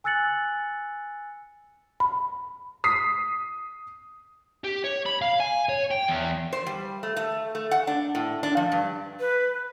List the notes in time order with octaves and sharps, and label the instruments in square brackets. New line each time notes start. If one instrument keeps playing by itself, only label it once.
[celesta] G#5 E6 F#6 A6 C#7 F#7
[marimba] B5
[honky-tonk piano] D#6 B6 C7
[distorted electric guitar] G4
C#5
B5
F5
G#5
C#5
G5
E2
[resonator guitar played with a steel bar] C5
G3
A3
A3
A3
F#5
D4
A2
D4
F3
G2
[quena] B4